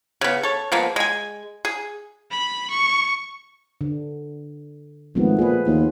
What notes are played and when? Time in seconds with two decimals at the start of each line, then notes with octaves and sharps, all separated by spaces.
0.21 C#3 B3
0.43 A4 C#5
0.72 F3 G#3 A#3 B3
0.96 G#3 G#5
1.65 G#4
2.31 B5
2.70 C#6
3.81 D3
5.15 G#1 F3 A3 B3
5.39 A#2 G#4 B4
5.67 D#2 F4